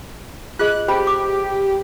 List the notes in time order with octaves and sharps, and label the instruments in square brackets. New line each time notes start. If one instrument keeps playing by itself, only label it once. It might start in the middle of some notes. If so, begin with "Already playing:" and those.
[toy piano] F4 G#4 D#5 [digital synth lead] F#6
[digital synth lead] G4 [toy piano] C5 B5
[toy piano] D6